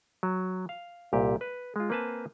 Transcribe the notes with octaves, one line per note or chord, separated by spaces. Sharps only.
F#3
F5
C2 A#2 G4
B4
G#3 F4
A#3 C4 B4 G#5 A5